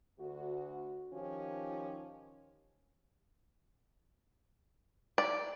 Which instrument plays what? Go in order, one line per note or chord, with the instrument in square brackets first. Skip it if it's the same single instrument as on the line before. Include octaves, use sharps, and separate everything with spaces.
[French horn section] D2 F#4
D#3 F3 C#4 F4 G4
[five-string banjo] D5